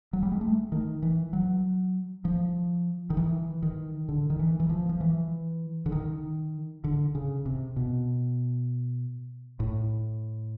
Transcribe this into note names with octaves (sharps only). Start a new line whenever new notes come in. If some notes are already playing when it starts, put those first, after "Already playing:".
F#3
G3
G#3
A3
D#3
E3
F#3
F3
D#3
E3
D#3
D3
D#3
E3
E3
F3
F3
E3
D3
D#3
D3
C#3
C3
B2
A2